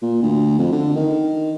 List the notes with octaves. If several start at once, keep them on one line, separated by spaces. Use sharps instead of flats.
A#2
D2
F2
D3
D#3